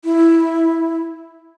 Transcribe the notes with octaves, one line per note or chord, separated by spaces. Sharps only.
E4